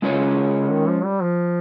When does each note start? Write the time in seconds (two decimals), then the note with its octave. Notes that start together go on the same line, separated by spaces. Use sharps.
0.02 C#3 G#3 C#4 F4 A#4 C#5
0.71 D#3
0.88 F3
1.05 G3
1.22 F3